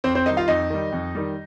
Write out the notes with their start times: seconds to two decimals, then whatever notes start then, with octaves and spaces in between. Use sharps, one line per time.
0.04 F2 C4 C5
0.15 C4 C5
0.26 D#3 G3 D#4 D#5
0.37 F4 F5
0.48 F2 D#4 D#5
0.70 D#3 G3
0.92 F2
1.15 D#3 G3